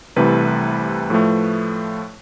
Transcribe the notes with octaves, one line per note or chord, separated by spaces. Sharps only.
C2 C3 E3 A3 B4
A2 F3 A3